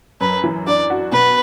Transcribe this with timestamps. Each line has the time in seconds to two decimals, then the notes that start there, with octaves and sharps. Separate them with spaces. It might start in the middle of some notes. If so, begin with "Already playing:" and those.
0.21 F#2 B4
0.44 E3
0.67 D4 D5
0.90 F#4
1.12 B2 B4